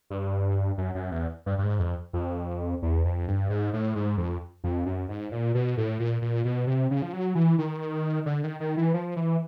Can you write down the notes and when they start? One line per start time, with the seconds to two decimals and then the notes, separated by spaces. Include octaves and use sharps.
0.10 G2
0.78 F#2
0.95 F#2
1.11 E2
1.46 G2
1.58 G2
1.63 G#2
1.79 F2
2.13 F2
2.82 E2
3.05 F2
3.28 G2
3.50 G#2
3.73 A2
3.95 G#2
4.17 F2
4.64 F2
4.86 F#2
5.09 G#2
5.31 A#2
5.55 B2
5.77 A2
6.00 A#2
6.22 A#2
6.45 B2
6.67 C3
6.91 C#3
7.02 F3
7.13 F#3
7.35 E3
7.58 D#3
8.26 D3
8.44 D#3
8.60 D#3
8.77 E3
8.94 F3
9.16 E3